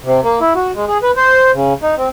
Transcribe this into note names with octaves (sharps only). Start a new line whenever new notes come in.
C3
A#3
E4
F#4
G#3
G#4
B4
C5
C#3
D#4
C4